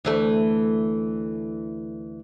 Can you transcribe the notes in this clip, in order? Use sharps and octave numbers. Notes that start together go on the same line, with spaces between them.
D2 E3 A3